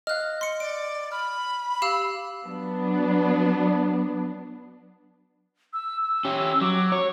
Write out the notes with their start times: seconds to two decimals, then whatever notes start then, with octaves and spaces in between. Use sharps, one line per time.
0.07 D#5 F5 F6 F#6
0.41 C6 C#7
0.60 D5 D7
1.12 B5 F6
1.82 G4 F5 E6
2.45 F#3 B3 D4
5.73 E6
6.02 E6
6.25 C#4 G4
6.62 F#3 D6
6.92 C#5